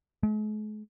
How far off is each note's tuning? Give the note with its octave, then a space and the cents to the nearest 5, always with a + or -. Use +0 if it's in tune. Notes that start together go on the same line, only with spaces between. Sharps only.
G#3 +45